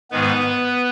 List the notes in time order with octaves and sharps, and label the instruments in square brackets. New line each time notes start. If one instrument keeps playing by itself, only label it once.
[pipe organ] G#2 D#3 G#3 B3 B4